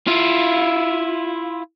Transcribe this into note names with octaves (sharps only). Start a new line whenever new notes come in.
E4 F4